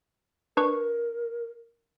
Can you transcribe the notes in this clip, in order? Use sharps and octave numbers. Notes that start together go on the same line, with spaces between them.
D4 A#4 B4 C#6